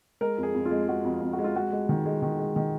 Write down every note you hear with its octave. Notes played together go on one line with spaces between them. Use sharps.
G#3 A#4
F2
G#4
F2
F4
G#3
G#3 F#4
F2
F2
F#4
G#3
F4
G#3 F#4
G#3
D#3
G#3
D#3
G#3
D#3